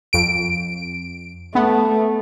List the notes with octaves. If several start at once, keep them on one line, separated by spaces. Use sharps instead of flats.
F2 D7
A3 B3